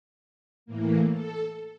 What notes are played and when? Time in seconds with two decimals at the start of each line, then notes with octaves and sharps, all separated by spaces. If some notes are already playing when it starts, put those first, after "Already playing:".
0.66 A2 E3 A#3
1.11 A4